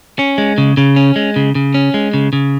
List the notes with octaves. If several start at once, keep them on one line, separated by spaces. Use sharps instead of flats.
C#4
G#3
C#3
C#3
C#4
G#3
C#3
C#3
C#4
G#3
C#3
C#3